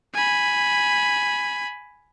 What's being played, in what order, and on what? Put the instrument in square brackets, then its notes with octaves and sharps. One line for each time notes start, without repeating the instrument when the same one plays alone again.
[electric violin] G#5 B5